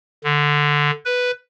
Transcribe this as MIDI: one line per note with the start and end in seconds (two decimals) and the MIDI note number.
0.24 0.91 50
1.05 1.31 71